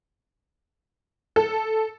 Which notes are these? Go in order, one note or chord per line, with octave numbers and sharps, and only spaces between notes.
A4